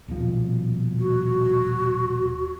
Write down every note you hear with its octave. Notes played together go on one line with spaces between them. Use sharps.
D#1 B2 F3
F#4